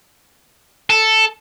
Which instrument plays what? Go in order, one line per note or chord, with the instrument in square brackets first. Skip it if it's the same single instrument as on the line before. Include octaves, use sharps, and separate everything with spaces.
[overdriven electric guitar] A4